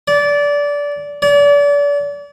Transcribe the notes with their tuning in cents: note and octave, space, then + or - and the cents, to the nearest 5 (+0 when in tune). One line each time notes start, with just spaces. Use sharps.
D5 -20
D5 -35